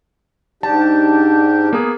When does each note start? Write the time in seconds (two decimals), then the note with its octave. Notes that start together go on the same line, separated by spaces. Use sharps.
0.63 G#2 D4 G4 A5
1.73 A#3 B3 G#4